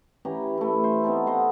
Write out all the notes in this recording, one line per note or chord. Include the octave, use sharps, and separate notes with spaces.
E3 C#4 G4 A#5
A3 E4
C5
B3 C4 D#4 A4
B4 C5 D#5 F#5